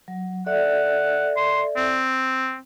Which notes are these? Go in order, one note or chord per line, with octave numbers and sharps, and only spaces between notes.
F#3
A4 D5 E5 F#5
C6
C4